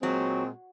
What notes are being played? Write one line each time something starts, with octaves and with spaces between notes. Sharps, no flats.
A#2 F#3 G#3 C4